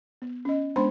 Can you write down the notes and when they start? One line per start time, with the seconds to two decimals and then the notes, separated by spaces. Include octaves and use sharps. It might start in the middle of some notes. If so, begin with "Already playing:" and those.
0.22 B3
0.45 C#4 D#5
0.76 G#3 B3 D4 C5 B5 C6